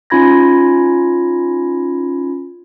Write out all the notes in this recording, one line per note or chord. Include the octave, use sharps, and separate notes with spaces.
C#4 D#4 F4 B5 G#6 A#6